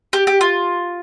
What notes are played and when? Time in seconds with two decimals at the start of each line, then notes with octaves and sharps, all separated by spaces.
0.13 G4
0.27 G4
0.41 F4